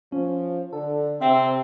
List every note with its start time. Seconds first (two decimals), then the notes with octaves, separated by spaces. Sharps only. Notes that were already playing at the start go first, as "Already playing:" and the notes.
0.12 F3 C#4
0.73 D3 A4
1.21 C3 C4 E5